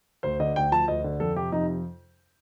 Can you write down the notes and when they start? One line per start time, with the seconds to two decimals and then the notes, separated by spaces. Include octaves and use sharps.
0.23 D2 C5
0.40 D3 D#5
0.56 D2 G5
0.72 F3 A5
0.88 D2 D#5
1.04 D3
1.20 F2 A4
1.36 C3 G4
1.52 F2 D#4